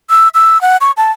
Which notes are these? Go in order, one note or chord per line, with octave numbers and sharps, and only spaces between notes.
E6
E6
F#5
C#6
A5